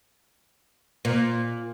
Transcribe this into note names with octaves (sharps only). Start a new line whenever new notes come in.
A#2